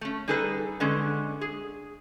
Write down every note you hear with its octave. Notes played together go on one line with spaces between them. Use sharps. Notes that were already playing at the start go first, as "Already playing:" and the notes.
A3 C#4
G3 D#4 G#4 A4 B4
D3 G#3 C#4
G#4